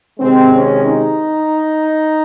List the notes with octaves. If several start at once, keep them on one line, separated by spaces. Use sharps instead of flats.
C3 D#3 G#3 C4
C#4
D#4